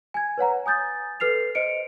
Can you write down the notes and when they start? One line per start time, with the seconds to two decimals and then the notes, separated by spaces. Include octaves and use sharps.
0.14 G#5 G#6
0.38 B4 C#5 F#5 A#5
0.66 G#5 D#6 G6 A6
1.20 A4 B4 F6 C7 F7
1.55 C5 D#5 C#7 D7